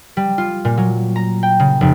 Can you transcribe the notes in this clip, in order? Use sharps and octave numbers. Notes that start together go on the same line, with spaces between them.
G3
F4
A#2
F#3
A#5
G5
C#3
F1